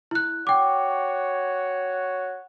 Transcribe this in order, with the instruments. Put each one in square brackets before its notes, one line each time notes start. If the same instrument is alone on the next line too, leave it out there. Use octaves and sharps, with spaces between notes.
[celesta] E4 F#6
[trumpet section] F#4 C#5 [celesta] G5 D6